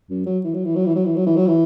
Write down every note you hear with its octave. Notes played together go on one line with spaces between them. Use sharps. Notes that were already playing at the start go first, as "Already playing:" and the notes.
F#2
F#3
E3
F#3
E3
F#3
E3
F#3
E3
F#3
E3
F#3
E3